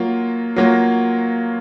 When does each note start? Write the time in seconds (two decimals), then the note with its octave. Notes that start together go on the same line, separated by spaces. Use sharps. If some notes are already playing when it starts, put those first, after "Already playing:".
Already playing: F#3 A#3 F4
0.56 F#3 A#3 F4